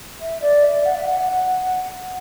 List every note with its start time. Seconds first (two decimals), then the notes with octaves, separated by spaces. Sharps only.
0.21 E5
0.41 D5
0.63 E5
0.85 F#5
0.95 E5
1.05 F#5